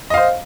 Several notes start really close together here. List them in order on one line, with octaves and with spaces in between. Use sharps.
D#5 F5 C5